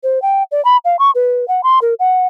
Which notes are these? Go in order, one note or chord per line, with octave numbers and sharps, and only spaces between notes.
C5
G5
D5
B5
F5
C#6
B4
F#5
C6
A#4
F#5